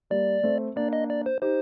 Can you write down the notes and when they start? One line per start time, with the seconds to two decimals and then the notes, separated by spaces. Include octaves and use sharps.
0.10 G3 A#3 D5
0.43 A3 C4
0.76 A#3 D4 D5
0.93 D#5
1.10 D5
1.26 C5
1.42 D#4 G4 C5